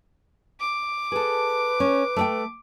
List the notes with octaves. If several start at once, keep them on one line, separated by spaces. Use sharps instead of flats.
D6
G#4 A4 B4
C#4
A3 D5 G5